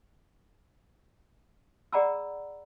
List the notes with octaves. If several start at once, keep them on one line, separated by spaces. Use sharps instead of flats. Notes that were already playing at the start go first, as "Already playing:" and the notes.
G#4 D5 F#5 A#5 B5 E6